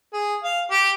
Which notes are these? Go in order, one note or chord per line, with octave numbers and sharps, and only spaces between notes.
G#4
F5
G4